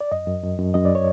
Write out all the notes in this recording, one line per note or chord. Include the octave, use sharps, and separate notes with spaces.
D5
F#2 D#5
F#2
F#2
F#2
F#2 D#5
D5
C#5